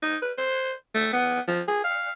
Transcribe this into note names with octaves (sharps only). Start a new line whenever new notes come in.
D#4
B4
C5
A3
B3
F3
G#4
F5